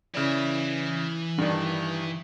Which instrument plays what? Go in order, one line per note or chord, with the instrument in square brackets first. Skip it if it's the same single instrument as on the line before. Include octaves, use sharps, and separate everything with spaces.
[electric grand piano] C#3 E4 D5 [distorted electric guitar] E3 E5
[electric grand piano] G2 D#3 [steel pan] D4